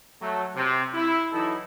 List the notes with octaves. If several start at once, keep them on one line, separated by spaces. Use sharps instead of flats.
F#3 A3
C3
E4
E3 F#3 D#4 E4 A4